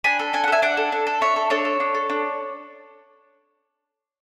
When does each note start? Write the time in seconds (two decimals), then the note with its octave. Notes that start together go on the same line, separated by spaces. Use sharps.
0.04 D4 G#5 B5
0.19 A4
0.33 D4 G#5
0.44 F#5
0.48 A4
0.52 E5 G#5
0.62 D4 D5 F#5
0.77 A4
0.92 D4
1.07 A4
1.21 D4 C#5 E5
1.36 A4
1.50 D4 A4 C#5
1.65 A4
1.80 D4
1.94 A4
2.09 D4